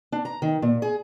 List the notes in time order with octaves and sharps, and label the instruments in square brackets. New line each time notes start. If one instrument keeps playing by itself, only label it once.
[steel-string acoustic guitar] D4
A#5
D#3
A#2
G#4